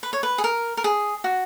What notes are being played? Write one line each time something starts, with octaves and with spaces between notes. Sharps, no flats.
B4
C#5
B4
G#4
A#4
A#4
G#4
F#4